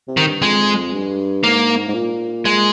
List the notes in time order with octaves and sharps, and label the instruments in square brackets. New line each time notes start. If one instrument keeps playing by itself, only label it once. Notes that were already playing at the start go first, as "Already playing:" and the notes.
[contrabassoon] C3
[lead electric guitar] D#3
[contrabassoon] G2
[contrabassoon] F2 [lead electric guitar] G#3
[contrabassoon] G2
[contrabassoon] G#2 [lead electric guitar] A#3
[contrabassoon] G#2
A#2
[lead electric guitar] G#3